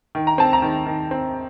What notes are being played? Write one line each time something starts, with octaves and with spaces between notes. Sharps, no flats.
D#3
A#5
C4 A5
A#5
D#3
D#3
C4